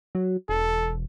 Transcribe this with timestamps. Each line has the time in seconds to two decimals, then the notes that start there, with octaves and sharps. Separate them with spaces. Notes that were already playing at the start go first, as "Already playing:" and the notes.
0.15 F#3
0.49 E1 A4